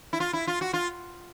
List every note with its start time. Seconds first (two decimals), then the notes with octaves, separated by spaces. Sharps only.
0.13 E4
0.20 F4
0.33 E4
0.47 F4
0.61 F#4
0.73 F4